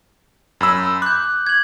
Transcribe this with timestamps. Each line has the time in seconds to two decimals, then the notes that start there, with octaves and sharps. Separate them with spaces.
0.61 F#2 B5 E6
1.02 D6 F#6 G6
1.46 G#6 F#7